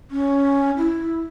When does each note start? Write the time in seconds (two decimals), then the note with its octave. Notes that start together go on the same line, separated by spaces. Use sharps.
0.11 C#4
0.77 E4